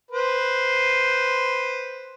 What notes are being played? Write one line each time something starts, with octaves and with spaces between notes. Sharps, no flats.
B4 C5